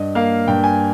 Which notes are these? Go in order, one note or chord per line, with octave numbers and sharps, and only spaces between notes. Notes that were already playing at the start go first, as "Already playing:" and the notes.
Already playing: G2 D#5
A#3 F5
G2 G5
G#5